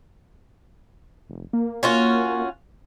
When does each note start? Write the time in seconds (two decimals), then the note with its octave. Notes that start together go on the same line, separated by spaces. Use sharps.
1.29 F1
1.53 A#3
1.83 C#4 F4 F#4